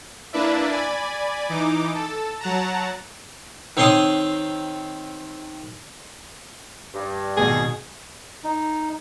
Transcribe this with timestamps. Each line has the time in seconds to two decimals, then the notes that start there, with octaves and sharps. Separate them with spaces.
0.33 A#3 D4 E4 B4 D5 E5
0.71 D5 G#5 B5
1.49 E3 D#4 D6
1.95 A4
2.40 F#3 F#5 A5 A#5
3.77 D#3 C4 C#5 C6 D6 D#6
6.93 G2
7.37 G#1 B2 G#4
8.44 D#4